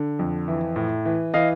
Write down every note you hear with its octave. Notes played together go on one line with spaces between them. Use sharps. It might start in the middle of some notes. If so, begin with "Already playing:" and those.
Already playing: D3
F2
E3
A2
E3
E3 D#5 F5